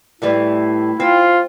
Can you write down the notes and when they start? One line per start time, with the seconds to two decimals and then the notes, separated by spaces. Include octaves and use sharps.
0.22 A2 E3 G3 E4
1.00 C4 F4